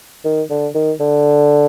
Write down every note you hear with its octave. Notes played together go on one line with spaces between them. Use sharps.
D#3
D3
D#3
D3